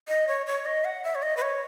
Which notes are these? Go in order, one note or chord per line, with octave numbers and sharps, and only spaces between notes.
D#5
C#5
C#5
D#5
F#5
E5
C#5
D#5
B4
C#5